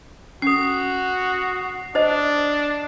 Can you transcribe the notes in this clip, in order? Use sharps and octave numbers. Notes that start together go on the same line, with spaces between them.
C#4 F#4 A4 D#6 C7
D4 C5 D#5 A5